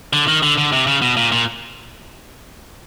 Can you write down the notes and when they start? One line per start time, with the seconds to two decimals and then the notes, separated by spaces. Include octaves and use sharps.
0.13 D3
0.27 D#3
0.43 D3
0.57 D3
0.72 C3
0.87 C#3
1.02 B2
1.17 A#2
1.32 A#2